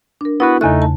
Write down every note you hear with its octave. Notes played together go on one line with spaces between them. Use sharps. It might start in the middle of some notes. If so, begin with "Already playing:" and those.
D4 A#4
B3 E4 F#4 B4 F#5
E2 C#3 A3 D#4 F#6
A5